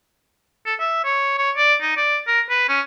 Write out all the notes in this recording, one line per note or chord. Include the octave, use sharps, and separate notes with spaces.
A4
E5
C#5
C#5
D5
D#4
D5
A#4
B4
C#4